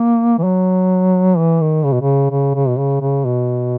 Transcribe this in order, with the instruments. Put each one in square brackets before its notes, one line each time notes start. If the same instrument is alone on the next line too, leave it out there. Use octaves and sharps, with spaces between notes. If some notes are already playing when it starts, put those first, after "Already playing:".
Already playing: [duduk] A#3
E3
F#3
E3
D#3
C#3
B2
C#3
C#3
C#3
B2
C#3
C#3
B2